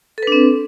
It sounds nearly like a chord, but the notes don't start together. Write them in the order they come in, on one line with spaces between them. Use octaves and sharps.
A4 B4 D4 C4